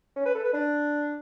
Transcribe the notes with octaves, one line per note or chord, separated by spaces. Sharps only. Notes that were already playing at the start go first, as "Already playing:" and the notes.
C#4
B4
A4
B4
D4